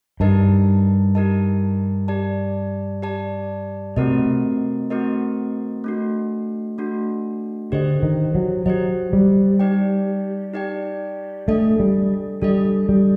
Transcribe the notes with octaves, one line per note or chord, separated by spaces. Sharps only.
G2 D#4 G4 A#4 D#5 A5
D#4 G4 A#4 D#5 A5
G4 D5 A5
G4 D5 A5
C3 A3 C4 F#4 A#4 D#5
A3 C4 F#4 A#4 D#5
A3 D4 F#4
A3 D4 F#4
D3 G4 C5 D#5
D#3
F#3
F#3 G4 C5 D#5
G3
D#4 G4 D5 G5
D#4 G4 D5 G5
A3 D4 A4 D#5
G3
G3 D4 A4 D#5
G3